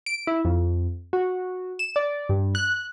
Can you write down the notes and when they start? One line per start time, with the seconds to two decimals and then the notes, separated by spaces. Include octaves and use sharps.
0.06 D7
0.27 E4
0.45 F2
1.13 F#4
1.79 E7
1.96 D5
2.29 G2
2.55 F#6